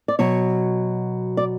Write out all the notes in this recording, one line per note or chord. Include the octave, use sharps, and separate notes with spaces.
D5
B2 F#3 C#5
D5